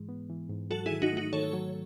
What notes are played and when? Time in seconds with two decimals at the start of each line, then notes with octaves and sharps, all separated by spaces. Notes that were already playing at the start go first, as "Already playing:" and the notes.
Already playing: G#2 E3 G#3
0.09 B3
0.29 E3
0.50 G#2
0.70 F#3 F#4 A4
0.86 E4 G#4
0.91 D#3
1.02 D#4 F#4
1.12 A3 D#4 F#4
1.33 D#3 A4 C#5
1.53 F#3